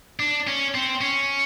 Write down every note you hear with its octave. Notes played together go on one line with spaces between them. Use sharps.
D4
C#4
C4
C#4